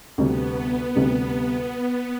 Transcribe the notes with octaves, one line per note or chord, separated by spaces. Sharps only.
D2 C3 G3 B3
D2 C3 G3 B3